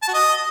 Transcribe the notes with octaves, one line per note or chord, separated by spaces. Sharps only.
A5
F#4
D#5